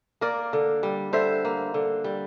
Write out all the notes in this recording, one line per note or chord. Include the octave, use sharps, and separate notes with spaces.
A#3 A#4 D5
D3
G3
D3 C5 E5
A#3
D3
G3